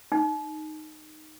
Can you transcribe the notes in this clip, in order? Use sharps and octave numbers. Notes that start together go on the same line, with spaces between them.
D#4